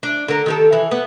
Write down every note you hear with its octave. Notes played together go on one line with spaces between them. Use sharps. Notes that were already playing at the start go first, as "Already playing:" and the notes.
D4
D3 A#4
D#3 G4 A4
E3
B3